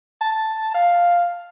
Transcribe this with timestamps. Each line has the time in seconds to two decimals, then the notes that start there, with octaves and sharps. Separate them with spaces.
0.21 A5
0.75 F5